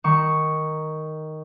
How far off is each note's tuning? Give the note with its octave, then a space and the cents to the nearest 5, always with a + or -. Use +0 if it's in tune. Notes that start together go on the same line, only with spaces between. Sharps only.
D#3 +0 C#6 +0